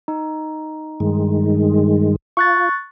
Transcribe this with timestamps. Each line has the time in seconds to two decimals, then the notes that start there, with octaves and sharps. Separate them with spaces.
0.08 D#4
1.00 G2 D#3 G#3
2.37 F4 C#6 F#6 A6